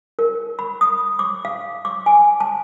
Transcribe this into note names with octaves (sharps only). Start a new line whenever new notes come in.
A#4
B5
D#6
D6
F5
D6
G#5
A5